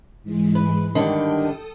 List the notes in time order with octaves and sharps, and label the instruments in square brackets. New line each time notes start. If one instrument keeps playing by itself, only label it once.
[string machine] G#2 E3 G#3
[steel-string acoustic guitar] B4
[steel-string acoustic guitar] G2 D3 D#3 [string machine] G5
[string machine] A4 D#6